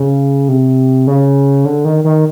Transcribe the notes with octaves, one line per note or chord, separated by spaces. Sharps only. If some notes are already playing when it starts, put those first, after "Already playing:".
Already playing: C#3
C3
C#3
D3
D#3
D#3